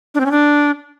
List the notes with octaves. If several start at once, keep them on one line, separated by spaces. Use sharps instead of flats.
D4
C4
C#4
D4